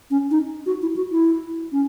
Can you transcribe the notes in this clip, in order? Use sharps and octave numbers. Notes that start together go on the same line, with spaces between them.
C#4
D#4
F#4
E4
F#4
E4
C#4